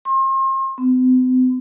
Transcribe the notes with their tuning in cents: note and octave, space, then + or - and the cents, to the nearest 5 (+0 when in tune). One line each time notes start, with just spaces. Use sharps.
C6 +40
C4 -45